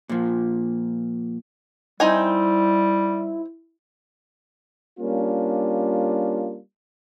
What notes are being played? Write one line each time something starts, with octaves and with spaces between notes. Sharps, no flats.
A#2 F3
G3 C4 D#4 E4 G#5
G3 A#3 C#4 D4 F4